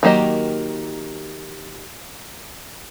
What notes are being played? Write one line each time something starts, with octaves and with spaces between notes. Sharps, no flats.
D#3 F#3 A#3 G4 D#5